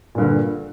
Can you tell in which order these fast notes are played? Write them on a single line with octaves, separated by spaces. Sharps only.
A#2 G2 D3